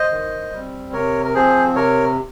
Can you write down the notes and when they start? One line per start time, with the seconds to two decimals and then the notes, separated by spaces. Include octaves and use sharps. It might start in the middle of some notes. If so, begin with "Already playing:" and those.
Already playing: C5 D#5
0.10 D#3
0.52 G3 C4
0.93 C3 A#4 C#5
1.25 A#4
1.34 F3 C4 G#4 C5
1.76 C3 A#4 C#5